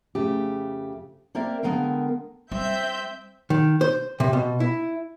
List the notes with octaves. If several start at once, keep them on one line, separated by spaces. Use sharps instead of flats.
F2 C#3 A3 G4
A#3 C4 A#4 D5 E5
D3 G#3 B3 A#4 F5 G5
G3 C4 E5 G6
D#3
C5
C3
B2
E4